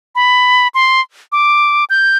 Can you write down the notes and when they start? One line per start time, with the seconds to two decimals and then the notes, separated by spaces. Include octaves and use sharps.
0.15 B5
0.74 C6
1.32 D6
1.90 G6